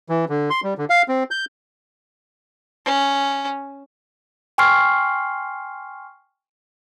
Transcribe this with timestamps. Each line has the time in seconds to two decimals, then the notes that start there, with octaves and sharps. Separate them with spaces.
0.09 E3
0.29 D3
0.50 C6
0.63 G3
0.78 D3
0.90 F5
1.08 C4
1.31 G6
2.85 C#4
4.58 G5 G#5 C6 C#6 F6 C7